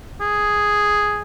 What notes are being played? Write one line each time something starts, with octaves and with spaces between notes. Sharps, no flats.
G#4